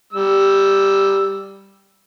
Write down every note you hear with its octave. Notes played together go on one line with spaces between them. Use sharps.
G3 E6